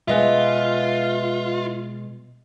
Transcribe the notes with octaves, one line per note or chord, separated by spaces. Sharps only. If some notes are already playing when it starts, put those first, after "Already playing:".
B2 G#3 F4 B4 D#5 E5 G#5